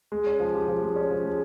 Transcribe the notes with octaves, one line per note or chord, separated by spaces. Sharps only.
G#3
C#4
F3
G4
F3
G#3
C#4
F3
G#3